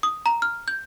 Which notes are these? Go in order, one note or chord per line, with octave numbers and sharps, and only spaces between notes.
D#6
A#5
F6
G6